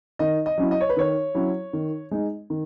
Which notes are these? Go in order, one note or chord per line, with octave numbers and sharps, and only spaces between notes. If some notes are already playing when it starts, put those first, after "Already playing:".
D#3 D#5
D#5
F#3 C#4 E4
D#5
C#5
B4
D#3 C#5
F#3 C#4 E4
D#3
G#3 D#4
D#3